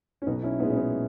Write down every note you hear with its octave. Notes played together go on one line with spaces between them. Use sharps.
C#4
B1 B3 D#4
C#4 E4
A#2 G#3 B3 D#4
C#4
B3 D#4